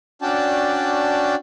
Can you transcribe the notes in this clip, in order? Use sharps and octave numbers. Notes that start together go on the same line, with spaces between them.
C#4 D4 F#4 D5 G5 A5